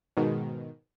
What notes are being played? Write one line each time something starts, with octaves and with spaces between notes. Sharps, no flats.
G#2 B2 D#3